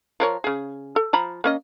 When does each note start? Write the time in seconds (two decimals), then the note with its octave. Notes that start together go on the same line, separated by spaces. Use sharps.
0.20 F3 A#4 C#5
0.44 C#3 G#4
0.96 A4
1.13 F3 A#5 B5
1.44 A#3 C#4 D#5